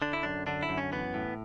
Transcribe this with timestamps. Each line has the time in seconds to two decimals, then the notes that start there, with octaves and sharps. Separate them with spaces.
0.02 D3 D4
0.13 E4
0.23 F#2 D4
0.47 D3 D4
0.63 E4
0.69 F#2
0.78 C#4
0.92 E3 B3
1.14 A2